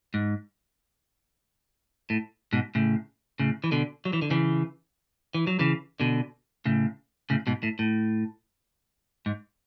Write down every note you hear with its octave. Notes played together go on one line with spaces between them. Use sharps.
G#2
A2
G#2 B2
A2 C#3
A2 C#3
E3
B2 D3
F#3
E3
D3
C#3 E3
E3
F#3
C#3 E3
B2 D3
A2 C#3
A2 C#3
G#2 B2
A2
A2
G#2